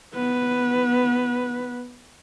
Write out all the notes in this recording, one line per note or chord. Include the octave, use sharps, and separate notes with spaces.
B3 B4